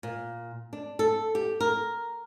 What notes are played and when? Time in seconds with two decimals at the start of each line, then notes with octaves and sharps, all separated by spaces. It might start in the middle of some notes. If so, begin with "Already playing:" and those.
0.03 A#2
0.73 D4
0.99 A4
1.35 G4
1.60 A#4